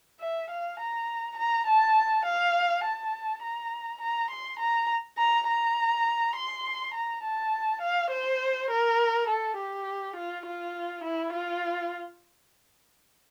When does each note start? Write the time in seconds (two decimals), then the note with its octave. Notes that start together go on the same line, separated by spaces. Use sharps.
0.20 E5
0.50 F5
0.79 A#5
1.37 A#5
1.67 A5
2.25 F5
2.84 A5
3.42 A#5
4.01 A#5
4.30 C6
4.59 A#5
5.18 A#5
5.47 A#5
6.36 C6
6.94 A#5
7.23 A5
7.81 F5
8.11 C5
8.70 A#4
9.28 A4
9.57 G4
10.16 F4
10.46 F4
11.03 E4
11.33 F4